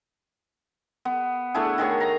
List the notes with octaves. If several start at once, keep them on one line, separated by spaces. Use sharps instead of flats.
B3
A3 D4 E4 G#4
D#3 A3 G#4 C#5
A#5